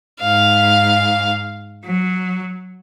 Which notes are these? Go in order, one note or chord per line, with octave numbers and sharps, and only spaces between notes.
G#2 F5
F#3